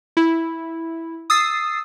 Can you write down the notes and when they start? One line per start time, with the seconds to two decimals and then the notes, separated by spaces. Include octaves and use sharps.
0.17 E4
1.30 D#6 E6 A6 C7